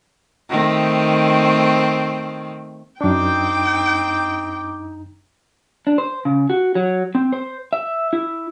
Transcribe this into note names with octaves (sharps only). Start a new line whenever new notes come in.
D#3 A3 C4
F#2 C4 D4 D#4 G5 D6
D4
C5
C#3
F#4
F#3
C4
C5
E5
E4